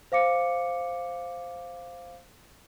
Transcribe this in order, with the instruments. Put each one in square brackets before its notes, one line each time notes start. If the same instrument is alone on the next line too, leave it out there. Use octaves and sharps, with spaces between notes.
[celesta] C5 F5 D6 C#7